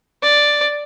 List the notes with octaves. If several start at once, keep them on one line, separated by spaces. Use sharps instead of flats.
D5